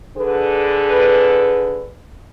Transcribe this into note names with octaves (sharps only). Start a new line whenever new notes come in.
D3 G#4 B4